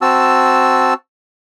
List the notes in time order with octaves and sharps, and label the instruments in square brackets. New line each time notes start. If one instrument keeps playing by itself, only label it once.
[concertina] C4 F#4 A5 E6